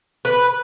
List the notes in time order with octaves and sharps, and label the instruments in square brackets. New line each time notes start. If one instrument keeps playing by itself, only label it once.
[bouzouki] B4